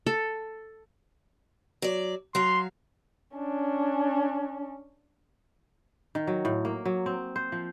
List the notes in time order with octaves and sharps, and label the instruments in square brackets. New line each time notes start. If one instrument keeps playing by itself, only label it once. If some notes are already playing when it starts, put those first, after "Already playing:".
[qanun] A4
[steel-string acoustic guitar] F#3 D5
[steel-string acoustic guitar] F#3 F5 [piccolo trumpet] C6
[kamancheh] C#4 D4
[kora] D#3
F#3
A2
A#3
F#3
C4
C5
F3